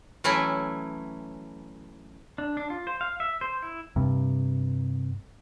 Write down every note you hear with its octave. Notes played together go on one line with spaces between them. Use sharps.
E3 F#3 A3 C#4 E4
D4
D4
F4
C5
F5
E5
C5
E4
G2 C3